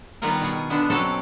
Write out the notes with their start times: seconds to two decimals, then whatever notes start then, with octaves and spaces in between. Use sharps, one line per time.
0.22 D#3 G3 B3 F4 G#4 A#4
0.41 B2 G#4
0.70 D3 B3 D4
0.90 B2 F#3 C4 C#4 A4 A5